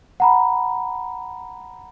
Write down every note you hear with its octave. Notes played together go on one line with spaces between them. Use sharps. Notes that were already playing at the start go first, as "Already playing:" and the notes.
F#5 A#5 B5